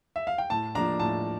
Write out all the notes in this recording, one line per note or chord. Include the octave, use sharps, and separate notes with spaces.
E5
F5
G5
A2 A5
F3 A#3 D4 A#5
A2 A5